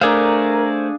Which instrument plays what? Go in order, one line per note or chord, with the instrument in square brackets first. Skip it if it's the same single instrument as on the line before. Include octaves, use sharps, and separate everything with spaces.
[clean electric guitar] A3 [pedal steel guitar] D4 G#4 F5 [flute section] A#4 [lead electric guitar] C5 D5